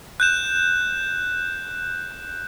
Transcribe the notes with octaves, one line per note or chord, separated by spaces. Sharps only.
F#6 G6 E7